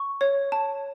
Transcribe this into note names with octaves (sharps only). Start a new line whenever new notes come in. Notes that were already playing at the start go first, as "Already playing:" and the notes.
Already playing: C#6
C#5
A5